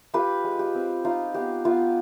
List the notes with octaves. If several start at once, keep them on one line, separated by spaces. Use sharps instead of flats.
F4 G4 B4
G#3
G4
C4
D#4 F4
B3 G4
B3 F4